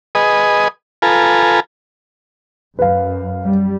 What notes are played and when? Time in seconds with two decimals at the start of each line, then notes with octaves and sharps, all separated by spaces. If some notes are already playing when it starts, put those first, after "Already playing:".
0.15 G#4 B4 D#5
1.02 F4 A4 B4 G#5 A#5
2.79 F#2 B4 F5
3.45 G3